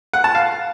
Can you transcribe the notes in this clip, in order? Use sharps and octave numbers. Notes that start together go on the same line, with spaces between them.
F#5
A5
F5